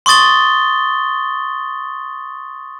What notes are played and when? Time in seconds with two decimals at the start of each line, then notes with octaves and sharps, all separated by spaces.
0.06 C6 C#6 D#6 A6 G7